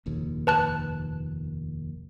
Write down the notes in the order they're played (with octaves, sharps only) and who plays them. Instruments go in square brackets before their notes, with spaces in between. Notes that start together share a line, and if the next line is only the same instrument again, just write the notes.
[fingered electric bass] F1 A#1 D#2
[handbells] B4 A5 F#6